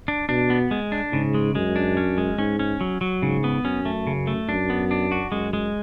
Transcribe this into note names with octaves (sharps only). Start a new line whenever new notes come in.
D4
B2 D4
B3
G#3
D4
G#2 C#3
G#3
F#2 G#3
D4
C#4
G#3
G#2 C#4
C#4
F#3
F#3
G#2 C#3
B3
F#2 C#4
A3
C#3
A3
F#2 D4
B3
D4
F#4
F#2 G#3
G#3